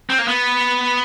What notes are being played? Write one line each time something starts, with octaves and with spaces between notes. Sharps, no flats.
C4
A#3
B3